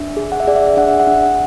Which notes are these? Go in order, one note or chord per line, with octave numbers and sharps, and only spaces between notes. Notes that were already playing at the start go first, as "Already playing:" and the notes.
Already playing: D4 E5
G#4
F#5
E5
G#4 D5
E5
D4 F#5
E5
F#5
D4